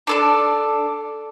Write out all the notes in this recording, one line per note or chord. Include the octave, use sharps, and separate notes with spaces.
D4 A4 D5